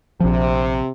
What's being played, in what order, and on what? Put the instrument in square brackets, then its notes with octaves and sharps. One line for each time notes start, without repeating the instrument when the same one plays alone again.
[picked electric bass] A#1 F3 [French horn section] C3